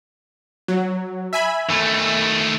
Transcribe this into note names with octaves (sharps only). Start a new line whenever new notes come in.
F#3
E5 G#5 B5
D#3 A3